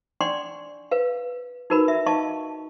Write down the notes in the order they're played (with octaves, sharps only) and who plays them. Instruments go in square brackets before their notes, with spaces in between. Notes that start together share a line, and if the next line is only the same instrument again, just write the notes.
[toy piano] D4 D5 F#5 G5 C6 C#6
B4 F5
D#4 F#4 A#4 B4 B5
E5
D#4 D#5 F5 A5 C#6